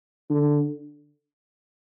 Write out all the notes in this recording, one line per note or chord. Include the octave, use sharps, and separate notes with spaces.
D3